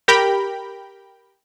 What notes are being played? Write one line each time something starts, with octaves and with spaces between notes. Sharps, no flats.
G4 A#4 G5 B5